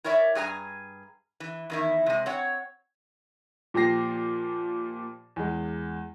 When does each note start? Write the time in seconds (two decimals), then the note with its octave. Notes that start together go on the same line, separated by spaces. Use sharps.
0.04 E4 A#4 C#5 D5 E5
0.35 G2 G#4 G#5 A#5
1.40 E3
1.70 E2 D#3 E4
2.06 C3 G#3
2.26 C4 C#5 F#5
3.74 A#2 F3 G4 A#6 C7
5.36 E2 G#3